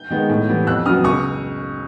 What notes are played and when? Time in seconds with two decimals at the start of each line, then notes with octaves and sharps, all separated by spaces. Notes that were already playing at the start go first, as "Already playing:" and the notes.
Already playing: G6
0.10 D#3 G#3 B3
0.29 A2
0.49 E3 G3 B3
0.66 F2 E6 F#6
0.86 C#3 F#3 B3 D#6 F6
1.04 C#2 C#6 D#6